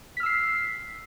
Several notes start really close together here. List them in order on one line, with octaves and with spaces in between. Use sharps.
B6 F6 E6 C7